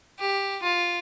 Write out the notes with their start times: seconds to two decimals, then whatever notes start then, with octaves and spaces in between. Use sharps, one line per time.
0.19 G4
0.63 F4